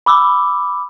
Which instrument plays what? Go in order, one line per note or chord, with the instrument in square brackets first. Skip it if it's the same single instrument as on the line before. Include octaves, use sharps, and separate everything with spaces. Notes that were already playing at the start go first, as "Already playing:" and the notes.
[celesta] B5 D6 E6